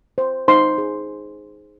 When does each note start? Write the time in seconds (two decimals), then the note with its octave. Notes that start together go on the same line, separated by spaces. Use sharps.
0.18 C5
0.48 D#4 C5 C6
0.78 G#4